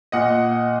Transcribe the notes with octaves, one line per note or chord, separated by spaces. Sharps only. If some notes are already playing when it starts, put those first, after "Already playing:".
A#2 D#5 F#5